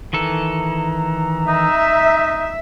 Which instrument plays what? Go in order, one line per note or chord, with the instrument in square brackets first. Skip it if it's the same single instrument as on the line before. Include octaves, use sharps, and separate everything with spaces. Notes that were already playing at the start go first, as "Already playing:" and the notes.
[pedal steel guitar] D#3 E3 A4 [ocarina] A#5
[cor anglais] D#4 [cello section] E5